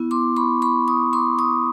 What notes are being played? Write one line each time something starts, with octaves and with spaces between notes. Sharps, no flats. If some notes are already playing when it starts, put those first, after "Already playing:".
Already playing: B3 E4
C6 D6
B5 C#6
B5 C#6
C#6 D#6
C6 D6
C#6 D#6